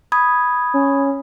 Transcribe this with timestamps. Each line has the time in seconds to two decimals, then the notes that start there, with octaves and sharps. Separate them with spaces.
0.12 B5 D#6 G#6
0.74 C#4